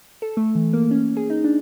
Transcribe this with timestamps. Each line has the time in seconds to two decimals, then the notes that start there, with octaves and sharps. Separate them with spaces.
0.22 A4
0.37 A3
0.55 E3
0.73 A#3
0.91 C#4
1.17 G#4
1.30 D#4
1.44 D4